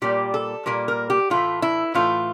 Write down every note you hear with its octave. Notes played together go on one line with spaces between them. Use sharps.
A#2 G3 A#3 G4
A4
A#2 G3 A#3 A#4
A#4
G4
A2 E3 A3 F4
E4
A2 E3 A3 F4